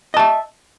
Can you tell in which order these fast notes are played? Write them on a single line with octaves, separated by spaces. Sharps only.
D#5 A5 E5